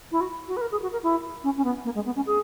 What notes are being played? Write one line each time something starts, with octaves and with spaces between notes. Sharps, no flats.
E4
F#4
F#4
B4
A#4
G#4
F#4
A#4
E4
C#4
C#4
B3
A#3
G#3
B3
C#4
G#4